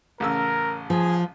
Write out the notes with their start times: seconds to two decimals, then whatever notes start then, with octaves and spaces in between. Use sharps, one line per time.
0.20 A1 C#3 A#4 E6
0.90 F3 G#4